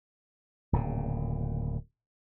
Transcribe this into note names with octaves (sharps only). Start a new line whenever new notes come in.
D1 A#2 C#3